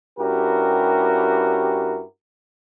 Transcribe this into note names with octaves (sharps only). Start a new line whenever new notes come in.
G2 C#4 E4 F#4 G4 A#4